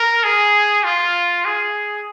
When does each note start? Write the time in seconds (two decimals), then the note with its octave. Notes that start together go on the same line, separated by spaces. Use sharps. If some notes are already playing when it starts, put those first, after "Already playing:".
Already playing: A#4
0.24 G#4
0.84 F4
1.45 G#4